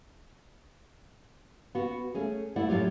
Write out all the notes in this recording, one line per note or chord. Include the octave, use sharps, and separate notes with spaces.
B3 F#4
A3 C#4 G#4
A3 E4 D5 F#5
A2 F#3 F4 G4